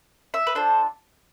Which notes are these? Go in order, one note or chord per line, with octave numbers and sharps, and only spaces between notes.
E5
B4
D4 F4 A4 C5